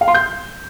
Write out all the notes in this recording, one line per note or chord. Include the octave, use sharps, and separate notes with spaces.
F5
C6
G6